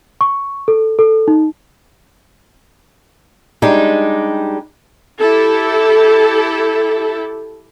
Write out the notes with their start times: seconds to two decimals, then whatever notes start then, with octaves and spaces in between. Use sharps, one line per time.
0.21 C#6
0.68 A4
0.99 A4
1.28 D#4
3.62 G3 G#3 D4 D#4 G4
5.21 E4 G4 A4